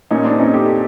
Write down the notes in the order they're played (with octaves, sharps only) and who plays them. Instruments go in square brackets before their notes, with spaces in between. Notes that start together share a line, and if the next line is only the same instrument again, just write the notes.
[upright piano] A#2 C#4 D#4
C4 D4
C#4 D#4
G4 A4